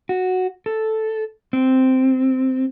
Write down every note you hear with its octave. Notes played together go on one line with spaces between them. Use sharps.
F#4
A4
C4